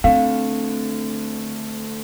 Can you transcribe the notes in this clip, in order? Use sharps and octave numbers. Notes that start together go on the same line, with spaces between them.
D3 A3 C4 F5